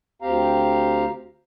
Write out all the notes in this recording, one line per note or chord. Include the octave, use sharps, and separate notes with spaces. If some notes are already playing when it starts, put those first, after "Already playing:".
D2 C4 G4 F5 A#5